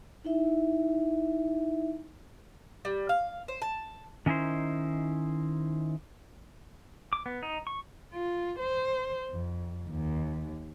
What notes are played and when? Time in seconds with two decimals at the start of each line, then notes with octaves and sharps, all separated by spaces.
0.25 D#4 E4 E5
2.85 G3
3.09 F5
3.48 C5
3.62 A5
4.26 D#3 C#4 D#4 E4 C5
7.13 D6
7.26 B3
7.43 D#4
7.67 C#6
8.14 F4
8.60 C5
9.32 F2
9.89 D#2